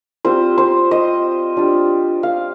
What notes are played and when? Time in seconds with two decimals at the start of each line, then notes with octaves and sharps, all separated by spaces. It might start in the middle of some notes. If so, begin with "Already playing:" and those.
0.25 G3 C4 F4 C5
0.58 C5
0.91 D#5
1.57 G3 D4 F4
2.23 F5